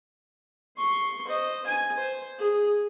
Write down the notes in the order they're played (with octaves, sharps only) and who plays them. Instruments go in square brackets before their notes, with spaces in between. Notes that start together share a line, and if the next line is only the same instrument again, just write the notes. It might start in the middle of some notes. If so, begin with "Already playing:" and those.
[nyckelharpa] C6 C#6
C5 D#5
G#5
C5
G#4